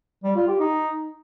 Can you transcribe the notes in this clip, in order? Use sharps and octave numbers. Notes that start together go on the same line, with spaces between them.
G3
F4
G4
D#4